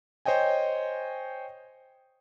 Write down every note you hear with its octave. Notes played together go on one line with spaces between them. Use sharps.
C5 C#5 D#5 G5 G#5